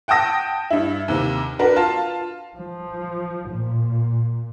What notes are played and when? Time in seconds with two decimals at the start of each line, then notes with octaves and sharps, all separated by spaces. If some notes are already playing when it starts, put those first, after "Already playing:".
0.08 F#5 G5 A5 D#6 A#6
0.70 G2 E4
1.08 D#2 C3
1.59 D4 F#4 A#4 B4
1.76 F4 F5 A5
2.57 F3
3.50 A#2